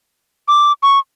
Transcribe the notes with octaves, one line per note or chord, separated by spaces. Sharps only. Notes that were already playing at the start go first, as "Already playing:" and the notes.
D6
C#6